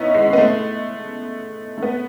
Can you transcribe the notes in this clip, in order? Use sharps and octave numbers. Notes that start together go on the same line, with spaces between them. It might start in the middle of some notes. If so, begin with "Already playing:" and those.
Already playing: B3 C#4 D#4 E4
G#3
B3
A3
A3
B3